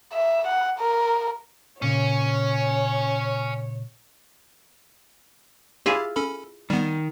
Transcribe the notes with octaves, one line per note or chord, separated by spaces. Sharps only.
E5
F#5
A#4
A#2 C#3 C#4 C#5
E4 F4 G4 G#4
C#4 A4 B5
D#3 G3 B3